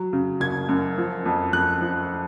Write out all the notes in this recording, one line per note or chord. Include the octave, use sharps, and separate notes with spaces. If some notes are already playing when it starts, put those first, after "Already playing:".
Already playing: F#3
C#3
F#1 G#6
F#2
F3
F2
F2 F#6
F3